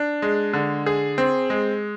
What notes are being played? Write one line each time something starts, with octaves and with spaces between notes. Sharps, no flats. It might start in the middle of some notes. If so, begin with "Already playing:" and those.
Already playing: D4
G#3
D3
G#4
C4
G#3